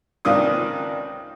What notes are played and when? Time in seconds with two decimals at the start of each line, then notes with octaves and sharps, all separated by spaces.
0.25 C#2 C3 D#3 D4 F4 D#6